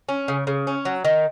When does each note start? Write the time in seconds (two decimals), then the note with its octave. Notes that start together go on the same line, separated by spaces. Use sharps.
0.09 C#4
0.28 C#3
0.47 C#3
0.67 C#4
0.85 F#3
1.05 D#3